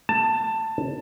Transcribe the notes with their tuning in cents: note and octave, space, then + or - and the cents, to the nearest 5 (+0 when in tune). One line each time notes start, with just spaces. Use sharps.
A5 +15